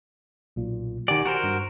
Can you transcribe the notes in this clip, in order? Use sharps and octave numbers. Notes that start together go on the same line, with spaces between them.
B1 A#2
D#3 G4 D5 F#5 G#5
F#4 A#4 C5
G2